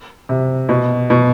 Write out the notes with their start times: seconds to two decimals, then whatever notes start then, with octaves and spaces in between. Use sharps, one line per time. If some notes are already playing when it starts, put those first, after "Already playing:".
0.29 C3
0.69 B2
1.10 B2